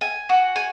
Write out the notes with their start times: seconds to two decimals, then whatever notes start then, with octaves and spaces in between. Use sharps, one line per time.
0.01 G#5
0.29 F#4
0.56 G#5